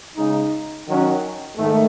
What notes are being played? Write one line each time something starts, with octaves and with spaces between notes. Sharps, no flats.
C#3 G#3 D#4
D#3 F#3 C#4
G#2 D#3 A3